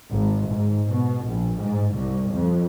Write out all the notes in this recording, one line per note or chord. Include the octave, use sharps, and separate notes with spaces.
G#1
G#2
B2
A#1
G#2
C2
F2